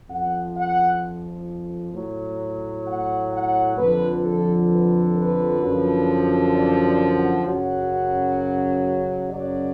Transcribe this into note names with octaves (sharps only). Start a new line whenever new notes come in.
F2 F3 F#5
F#5
A2 F#3
F#5
F#5
F2 D3 F3 B4
A4
B4
B4
F#2 D3 F3
D5
D5
F#5
F#2 C#3 F#3 F#5
F#2 C#3 F#3 D5